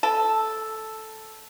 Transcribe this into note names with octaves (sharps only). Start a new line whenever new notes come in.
A4